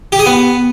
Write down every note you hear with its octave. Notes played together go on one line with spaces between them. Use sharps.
G4
G#4
B3